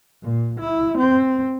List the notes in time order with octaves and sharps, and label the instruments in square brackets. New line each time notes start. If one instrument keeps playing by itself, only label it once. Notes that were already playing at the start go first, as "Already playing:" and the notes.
[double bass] A#2
E4
C4